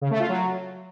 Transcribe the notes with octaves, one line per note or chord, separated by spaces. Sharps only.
C#3
A3
F4
F#3